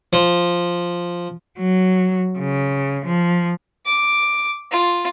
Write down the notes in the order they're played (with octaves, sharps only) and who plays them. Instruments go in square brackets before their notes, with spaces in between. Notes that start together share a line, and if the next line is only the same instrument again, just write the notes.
[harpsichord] F3
[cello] F#3
C#3
F3
[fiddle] D6
F4